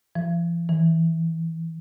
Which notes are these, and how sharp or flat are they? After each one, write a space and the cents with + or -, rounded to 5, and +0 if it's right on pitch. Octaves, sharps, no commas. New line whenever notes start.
E3 +40
E3 -10